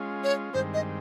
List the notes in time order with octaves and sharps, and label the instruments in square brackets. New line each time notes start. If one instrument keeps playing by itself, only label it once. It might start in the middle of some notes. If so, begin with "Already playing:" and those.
Already playing: [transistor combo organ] G#3 C#4 F4
[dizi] C#5
[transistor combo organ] G2 D#3 G#3 C4 [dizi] C5
[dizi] D#5